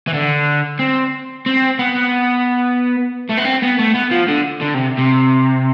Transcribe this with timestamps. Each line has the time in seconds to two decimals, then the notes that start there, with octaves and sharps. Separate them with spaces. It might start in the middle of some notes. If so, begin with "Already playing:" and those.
0.07 E3
0.14 D3
0.79 C4
1.46 C4
1.79 B3
3.29 A3
3.37 B3
3.44 C4
3.62 B3
3.78 A3
3.94 B3
4.11 F3
4.28 D3
4.61 D3
4.74 C3
4.99 C3